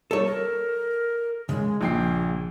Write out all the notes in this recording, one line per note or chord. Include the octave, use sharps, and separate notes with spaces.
G3 A4 C#5
A#4
C#3 G#3
A#1 A#3 G5 C7